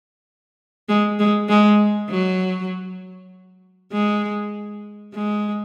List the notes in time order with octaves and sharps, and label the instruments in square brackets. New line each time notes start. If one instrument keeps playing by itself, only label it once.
[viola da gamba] G#3
G#3
G#3
F#3
G#3
G#3